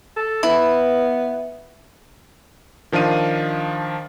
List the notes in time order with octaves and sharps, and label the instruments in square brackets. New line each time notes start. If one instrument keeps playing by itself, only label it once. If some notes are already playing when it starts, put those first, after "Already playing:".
[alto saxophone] A4
[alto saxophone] B3 [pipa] E4
[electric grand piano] D#3 F3 D4 F5 D#7